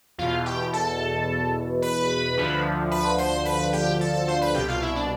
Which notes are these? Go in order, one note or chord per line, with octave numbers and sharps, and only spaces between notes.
E2 B2 F4 F5
G4 G5
A4 A5
B4 B5
D2 D3 F3
B4 B5
C5 C6
B4 B5
G4 G5
A4 A5
A4 A5
C5 C6
B4 B5
C2 B2 G4 G5
F4 F5
E4 E5
D4 D5